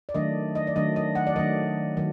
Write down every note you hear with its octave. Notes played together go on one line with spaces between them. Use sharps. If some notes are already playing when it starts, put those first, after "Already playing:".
D5
D#3 F#3 A3 D4 D#5
D#5
D5
D#3 F#3 A3 D4 D#5
D#5
F#5
D5
D#3 F#3 A3 D4 D#5
D#3 F#3